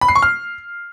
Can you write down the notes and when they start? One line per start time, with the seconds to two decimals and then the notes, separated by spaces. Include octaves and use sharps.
0.01 B5
0.08 C7
0.15 C#6
0.23 F6